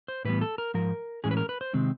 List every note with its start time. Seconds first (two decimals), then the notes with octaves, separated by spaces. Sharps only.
0.08 C5
0.25 A2 E3 G3 B3 B4
0.41 A4
0.58 A#4
0.74 G#2 F3 A#4
1.24 A2 E3 G#3 C#4 G#4
1.31 B4
1.37 A#4
1.49 B4
1.61 C5
1.73 C3 D#3 G#3 C4